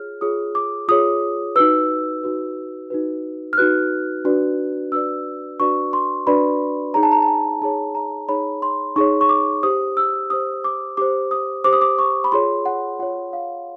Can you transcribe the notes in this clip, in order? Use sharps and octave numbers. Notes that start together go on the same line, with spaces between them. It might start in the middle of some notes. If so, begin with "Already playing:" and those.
Already playing: F4 G#4 C#5 F6
F4 G#4 C#5 D#6
D6
F4 G#4 C#5 D#6
D#4 F#4 B4 E6
D#4 F#4 B4
D#4 F#4 B4
F6
D#4 F#4 B4 F#6
D4 F#4 B4 D5
D4 F#4 B4 D5 E6
D4 F#4 B4 D5 C#6
C6
D4 F#4 B4 D5 B5
D#4 G#4 C#5 A#5
A5
A#5
A5
G#5
D#4 G#4 C#5 A5
A#5
D#4 G#4 C#5 B5
C6
D#4 G#4 C#5 C#6
C#6
D6
G4 C5 D#6
E6
G4 C5 D#6
D6
G4 C5 D6
D#6
G4 C5 D6
D#6
D6
C#6
B5
F4 G#4 C#5 C6
F#5
F4 G#4 C#5 F#5
F5